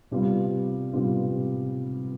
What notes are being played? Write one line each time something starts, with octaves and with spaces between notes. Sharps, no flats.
C3 G3 B3 F4
C3 G3 B3 F4